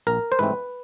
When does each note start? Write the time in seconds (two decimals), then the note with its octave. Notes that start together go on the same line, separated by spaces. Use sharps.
0.07 A#1 A#4
0.32 C5
0.39 G#2 E3 A3 C4 B4